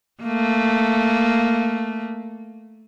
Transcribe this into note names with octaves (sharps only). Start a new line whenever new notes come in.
A3 A#3